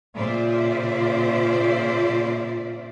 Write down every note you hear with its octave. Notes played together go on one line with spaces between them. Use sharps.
A#2 C#3 F4 C5 D5 E5